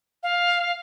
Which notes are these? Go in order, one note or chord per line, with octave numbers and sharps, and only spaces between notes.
F5